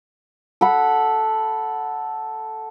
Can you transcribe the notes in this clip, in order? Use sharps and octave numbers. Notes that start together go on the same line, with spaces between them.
A4 F#5 B5